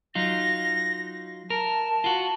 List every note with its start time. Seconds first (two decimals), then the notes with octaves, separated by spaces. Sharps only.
0.15 F#3 D#4 F4 A#6
1.50 A#4 A5
2.04 F4 F#4